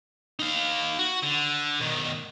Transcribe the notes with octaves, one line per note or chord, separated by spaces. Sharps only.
D#4 F5
F#4
D3
B2 D#3